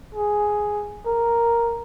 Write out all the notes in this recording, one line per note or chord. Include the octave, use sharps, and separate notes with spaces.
G#4
A#4